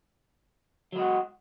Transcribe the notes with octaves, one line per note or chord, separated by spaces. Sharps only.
F#3 G#3 F#4